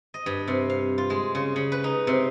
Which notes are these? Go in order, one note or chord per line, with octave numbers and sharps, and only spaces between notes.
D#5
G2
C3
F5
F4
G#3
C#3
C#3
B4
D#4
C3